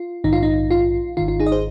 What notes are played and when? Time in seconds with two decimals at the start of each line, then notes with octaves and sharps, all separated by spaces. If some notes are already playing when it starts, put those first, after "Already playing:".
Already playing: F4
0.24 A#1 G#2 D#3 D#4
0.33 F4
0.43 D#4
0.71 F4
1.17 G#1 G#2 D#3 F4
1.28 F4
1.40 D#4 G#4
1.46 D#5
1.52 G#4 C5